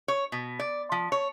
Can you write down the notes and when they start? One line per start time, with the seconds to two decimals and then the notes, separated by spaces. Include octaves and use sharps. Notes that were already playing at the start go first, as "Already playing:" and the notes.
0.08 C#5
0.32 B2
0.59 D5
0.92 F3
1.12 C#5